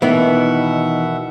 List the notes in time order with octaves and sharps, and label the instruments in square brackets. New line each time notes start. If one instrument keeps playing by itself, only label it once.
[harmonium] B2 E5 F#5 [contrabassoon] D#3 [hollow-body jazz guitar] E3 B3